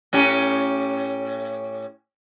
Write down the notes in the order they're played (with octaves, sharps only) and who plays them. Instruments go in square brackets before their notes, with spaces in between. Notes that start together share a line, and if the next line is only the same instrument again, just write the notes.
[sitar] A2 C#4 G4